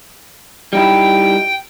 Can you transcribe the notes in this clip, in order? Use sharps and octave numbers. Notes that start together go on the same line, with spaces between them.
G3 D#4 E4 G5